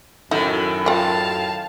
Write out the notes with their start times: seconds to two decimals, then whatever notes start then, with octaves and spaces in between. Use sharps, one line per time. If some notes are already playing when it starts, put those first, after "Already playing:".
0.31 F#2 A2 D#3 D#4 F#4 A4
0.86 F4 F5 G5 A5